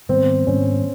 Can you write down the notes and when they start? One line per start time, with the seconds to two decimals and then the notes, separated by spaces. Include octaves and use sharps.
0.09 G#2 D#3 G3 B3 C4
0.47 G#2 D#3 G3 B3 C#4